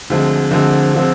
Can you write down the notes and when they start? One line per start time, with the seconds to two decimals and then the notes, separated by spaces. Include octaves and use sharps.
0.10 D2 D3 F3 G#3 C4
0.51 D2 D3 F3 G#3 C4
0.94 D3 F3 G#3 C4